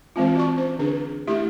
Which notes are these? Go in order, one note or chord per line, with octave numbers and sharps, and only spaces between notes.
E3 G#3 C4 F4
F#4 D5 A5 C#6
C#4 C5
D3 D4 G#4 B4
A3 E4 G4 E5